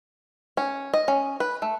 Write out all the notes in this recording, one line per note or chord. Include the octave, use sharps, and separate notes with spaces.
C#4
D#5
C#4
B4
A3